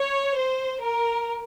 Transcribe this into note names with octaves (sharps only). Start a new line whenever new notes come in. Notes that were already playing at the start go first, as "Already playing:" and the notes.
Already playing: C#5
C5
A#4